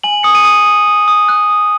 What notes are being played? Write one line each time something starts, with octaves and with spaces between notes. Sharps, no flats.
G#5 F#7
D#6 C#7
D#7
D#6
D#6
D#6
D#6
F#6
D#6